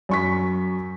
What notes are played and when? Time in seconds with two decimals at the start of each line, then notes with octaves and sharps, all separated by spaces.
0.09 F#2 C#6 B6